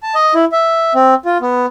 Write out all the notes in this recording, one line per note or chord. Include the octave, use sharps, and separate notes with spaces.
A5
D#5
E4
E5
C4
F4
B3